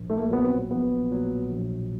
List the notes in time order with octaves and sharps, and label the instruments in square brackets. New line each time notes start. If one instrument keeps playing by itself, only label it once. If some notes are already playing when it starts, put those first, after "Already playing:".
Already playing: [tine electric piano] A#1
[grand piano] A3
A#3
[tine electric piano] A#2 F#3 [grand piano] B3
[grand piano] C4
[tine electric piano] A#1 [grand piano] B3
[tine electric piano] A#2 F#3
A#1